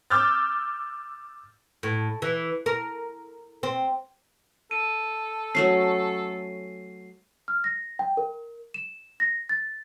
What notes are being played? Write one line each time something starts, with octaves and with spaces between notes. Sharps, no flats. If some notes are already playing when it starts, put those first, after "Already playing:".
D6 E6 F6 G6 A6
A2
E3
A#4
C4
A4 D#7
F#3 A3 C#4 C7
F6
A#6
G5
A#4
E7
A#6
A6